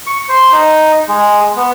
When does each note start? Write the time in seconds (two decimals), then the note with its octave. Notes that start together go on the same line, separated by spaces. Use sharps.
0.07 C#6
0.29 C5
0.52 D#4
1.08 G#3
1.56 B3